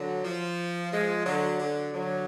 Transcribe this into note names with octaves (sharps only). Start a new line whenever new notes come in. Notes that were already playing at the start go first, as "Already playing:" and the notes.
Already playing: D3 F#3
F3
F3 G#3
D3 F#3
D3 F#3
D3 F#3